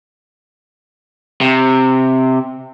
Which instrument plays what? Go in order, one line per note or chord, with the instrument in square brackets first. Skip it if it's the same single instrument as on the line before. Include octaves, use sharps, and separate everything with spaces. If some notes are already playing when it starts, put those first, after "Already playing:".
[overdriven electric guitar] C3